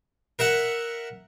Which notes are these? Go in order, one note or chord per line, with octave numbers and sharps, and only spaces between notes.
A#4 E5 F#5